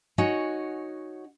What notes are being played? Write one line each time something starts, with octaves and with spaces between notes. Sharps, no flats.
D#4 F#4 C#5 F#5 G#5